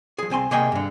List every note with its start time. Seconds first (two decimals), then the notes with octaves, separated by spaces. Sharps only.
0.18 F3 G#4
0.30 C2 C4 G#5 C6
0.51 C3 A#3 G#4 D#5 G5 G#5
0.72 G2 D3